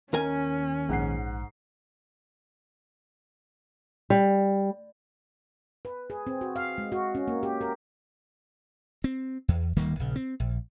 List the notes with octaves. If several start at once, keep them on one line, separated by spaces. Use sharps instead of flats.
D#2 C#4 A#4 G#5
A#1 G#2 F#5 C7
G3
B4
G#4
C4
F#4
F5
G#3
F#4
C#4
A#3
G4
A#4
C4
E2
D1 D#3 G3 A#3
A#1 C#3
C4
A#1